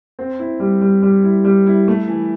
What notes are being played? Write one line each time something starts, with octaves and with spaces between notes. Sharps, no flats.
C4
E4
G3
G3
G3
E4
G3
E4
A3
E3